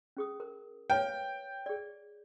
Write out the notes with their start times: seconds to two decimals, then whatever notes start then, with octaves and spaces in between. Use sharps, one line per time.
0.17 C#4 G#4 D#6
0.40 A#4
0.90 B4 C#5 F5 G5
1.66 G#4 D5